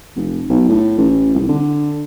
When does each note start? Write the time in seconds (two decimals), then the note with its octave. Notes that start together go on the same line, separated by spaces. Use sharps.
0.16 F1
0.50 B1
0.69 A2
0.98 A1
1.34 C2
1.49 D3